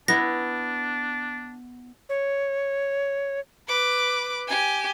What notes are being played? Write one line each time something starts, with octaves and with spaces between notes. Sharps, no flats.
B3 D4 E4 A#6
C#5
B4 D6
G4 G#5